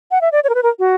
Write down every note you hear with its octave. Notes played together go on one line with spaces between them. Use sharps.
F#5
E5
D5
C#5
A#4
B4
A#4
F#4